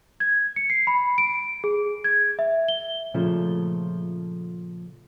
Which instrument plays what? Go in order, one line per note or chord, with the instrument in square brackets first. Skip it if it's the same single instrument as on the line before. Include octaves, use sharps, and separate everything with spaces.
[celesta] G#6
C#7
C7
B5
D7
G#4
G#6
E5
G7
[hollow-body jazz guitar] A#2 C#3 F3 A3